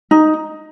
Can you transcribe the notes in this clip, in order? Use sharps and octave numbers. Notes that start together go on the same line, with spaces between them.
D#4